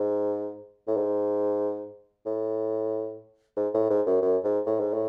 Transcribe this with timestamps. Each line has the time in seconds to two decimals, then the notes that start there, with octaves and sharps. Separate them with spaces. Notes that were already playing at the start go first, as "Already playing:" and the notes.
Already playing: G#2
0.87 A2
0.97 G#2
2.26 A2
3.56 G#2
3.74 A2
3.90 G#2
4.06 F#2
4.22 F#2
4.44 G#2
4.66 A2
4.80 G#2
4.93 A2